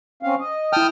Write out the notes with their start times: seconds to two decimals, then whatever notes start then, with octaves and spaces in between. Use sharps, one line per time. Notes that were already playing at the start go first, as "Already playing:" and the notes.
0.23 C4 C#4 F5
0.40 D#5
0.73 E4 G5 A5 D#6 F6